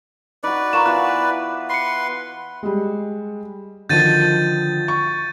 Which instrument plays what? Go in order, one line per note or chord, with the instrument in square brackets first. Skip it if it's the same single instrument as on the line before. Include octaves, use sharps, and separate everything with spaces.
[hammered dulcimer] D#4 F#4 [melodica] B4 D5
[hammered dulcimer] F4 F#4 A#4 [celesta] A#5 C#6 E7
[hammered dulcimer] E3 B3 [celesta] F#6
[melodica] B4 C6 [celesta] C7 C#7
[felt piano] G3 G#3
[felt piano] D3 D#3 F3 [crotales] G6 A6 D#7
[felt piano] C#6